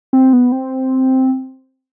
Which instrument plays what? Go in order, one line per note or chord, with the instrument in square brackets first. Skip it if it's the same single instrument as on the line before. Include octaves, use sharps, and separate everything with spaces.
[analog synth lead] C4
B3
C4